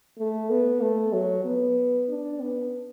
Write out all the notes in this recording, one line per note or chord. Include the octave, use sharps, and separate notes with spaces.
A3
B3
A3
F#3
B3
D4
B3